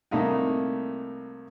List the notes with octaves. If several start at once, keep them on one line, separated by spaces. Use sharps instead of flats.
C2 A3 A#3 D#4